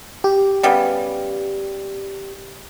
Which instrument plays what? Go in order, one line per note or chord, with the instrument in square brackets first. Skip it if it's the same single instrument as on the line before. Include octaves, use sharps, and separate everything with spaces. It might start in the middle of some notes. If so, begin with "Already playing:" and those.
[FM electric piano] G4
[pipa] C#3 G3 B3